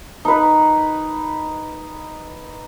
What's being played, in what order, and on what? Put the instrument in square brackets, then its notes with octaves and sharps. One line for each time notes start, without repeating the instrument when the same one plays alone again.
[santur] D#4 B4